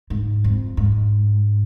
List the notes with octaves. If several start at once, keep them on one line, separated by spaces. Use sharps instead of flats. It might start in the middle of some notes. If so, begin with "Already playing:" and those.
G#2
F2
G#2